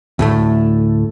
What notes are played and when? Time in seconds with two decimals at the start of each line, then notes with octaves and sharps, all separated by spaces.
0.19 D2 A2 A3